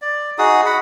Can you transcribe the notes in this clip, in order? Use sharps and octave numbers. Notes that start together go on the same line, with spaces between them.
D5
D#4 F#4 G#4 D#6
F#5 B5